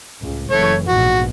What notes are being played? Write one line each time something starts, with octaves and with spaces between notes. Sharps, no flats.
C#2 A2
F#1 E3 A3 C#5 C#6
A#1 G#2 B2 F#4